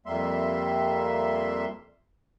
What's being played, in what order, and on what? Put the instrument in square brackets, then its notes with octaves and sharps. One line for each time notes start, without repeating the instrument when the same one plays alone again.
[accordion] F2 G3 A#3 E5 C6